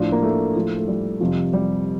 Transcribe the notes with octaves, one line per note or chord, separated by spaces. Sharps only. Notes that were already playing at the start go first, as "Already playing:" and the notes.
Already playing: A2 F3 D4
A#3
A3
A2 F3
A3
G3
F2 C3 F3
G3